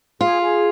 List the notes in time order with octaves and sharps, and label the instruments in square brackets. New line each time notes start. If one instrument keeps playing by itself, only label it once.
[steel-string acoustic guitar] F4 [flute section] G#4
[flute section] G#4